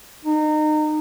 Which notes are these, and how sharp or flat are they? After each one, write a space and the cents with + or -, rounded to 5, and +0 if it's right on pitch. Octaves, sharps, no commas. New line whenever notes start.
D#4 -25